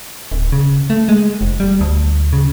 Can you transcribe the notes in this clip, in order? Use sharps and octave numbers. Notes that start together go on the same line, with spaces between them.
D1
C#3
A3
G#3
F1
G3
D2
C#3